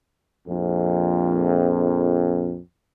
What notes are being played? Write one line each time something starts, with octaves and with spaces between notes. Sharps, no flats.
A#1 F2